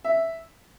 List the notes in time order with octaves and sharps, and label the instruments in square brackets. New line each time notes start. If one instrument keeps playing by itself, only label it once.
[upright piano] E5